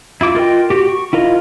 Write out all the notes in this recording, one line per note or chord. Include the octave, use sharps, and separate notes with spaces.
E4 F4 D6 E6
F4 A#4 D#5 G5
F#4 G4
C#6
E4 F4 A#4 D#5